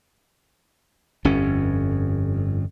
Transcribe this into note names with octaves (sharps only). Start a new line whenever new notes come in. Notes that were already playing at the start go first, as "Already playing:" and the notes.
G1 F2 C#4